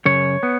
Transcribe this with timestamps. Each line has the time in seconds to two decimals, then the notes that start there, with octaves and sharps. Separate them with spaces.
0.05 F#2 C#3 C#5
0.43 B3